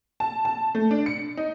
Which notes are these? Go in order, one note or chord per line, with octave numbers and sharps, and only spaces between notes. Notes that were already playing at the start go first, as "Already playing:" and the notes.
A5
A5
A3
D4
C#7
D#4